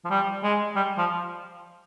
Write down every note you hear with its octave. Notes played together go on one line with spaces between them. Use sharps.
F3
G3
G#3
G3
F3